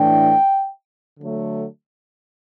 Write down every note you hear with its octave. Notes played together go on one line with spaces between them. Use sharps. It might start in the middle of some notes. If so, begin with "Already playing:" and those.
Already playing: A2 E3 A3 D4 G5
D3 F#3 A3